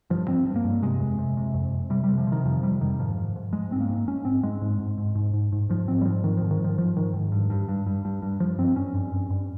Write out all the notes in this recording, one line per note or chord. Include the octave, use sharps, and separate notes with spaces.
G2 F3
G2 C4
G2
A#3
G2
C3 G#3
F2
C3
C3
F2
F2
C3 G3
C3 G3
F3
C3
D#3
F2 F3
C3 G3
F2 D#3
G#2 F3
G#2
G#2
G#2 G#3
G#2 C4
A#3
G#2
G#2 C#4
G#2 C4
G#2 G#3
G#2
G#2
G#2
G#2
G#2
G#2
G#2 F3
G#2 C4
G3
G#2 F3
G#2 D#3
G#2 F3
D#3
G#2 F3
G#2 F3
G#2 D#3
G#2
G2
G2
G2
G2
G2
G2
G2 F3
G2 C4
G2 C#4
G2
G2
G2